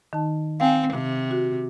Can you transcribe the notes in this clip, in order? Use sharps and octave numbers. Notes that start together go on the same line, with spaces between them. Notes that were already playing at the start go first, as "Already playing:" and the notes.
D#3 D#4 A5
C4 F5 G5 G#5
C3
F#4